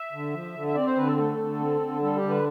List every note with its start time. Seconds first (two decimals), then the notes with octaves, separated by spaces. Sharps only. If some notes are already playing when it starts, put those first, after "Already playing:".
Already playing: E5
0.13 D3
0.33 F3
0.55 D3
0.67 E5
0.75 C4 D5
0.87 C5
0.96 D3 B4
1.07 A4
1.17 A3 A4
1.38 D3
1.60 C4
1.81 D3
2.02 G3 A4
2.17 G4
2.23 D3
2.30 B4